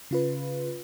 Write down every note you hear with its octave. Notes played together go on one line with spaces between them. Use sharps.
C#3 F4 B4